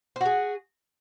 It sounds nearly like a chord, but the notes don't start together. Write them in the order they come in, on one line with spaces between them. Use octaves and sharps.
C5 F#4 G#4